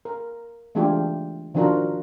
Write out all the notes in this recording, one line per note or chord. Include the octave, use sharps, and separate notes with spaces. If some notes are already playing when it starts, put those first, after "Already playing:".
A#4
E3 G#3 A3 D4 F4 G4
D#3 F3 D4 F4 F#4 A#4